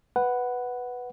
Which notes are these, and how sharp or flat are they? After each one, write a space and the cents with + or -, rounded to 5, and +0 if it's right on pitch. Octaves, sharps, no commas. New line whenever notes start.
B4 +0 F#5 +0